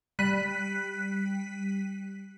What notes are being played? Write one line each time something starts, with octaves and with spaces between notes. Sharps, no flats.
G3 F#6 B6 D#7